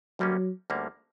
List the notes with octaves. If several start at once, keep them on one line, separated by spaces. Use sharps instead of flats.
D2 D3 F#3 G3 A#3 C#4
D2 D3 G3 A#3 C#4